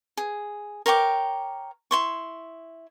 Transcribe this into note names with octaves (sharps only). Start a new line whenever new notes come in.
G#4
A#4 C#5 G5 D6
E4 C6 C#6